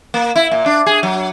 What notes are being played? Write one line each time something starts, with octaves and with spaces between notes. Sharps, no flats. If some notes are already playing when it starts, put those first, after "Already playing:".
A#3
E4
A#2
D4
G#4
F#3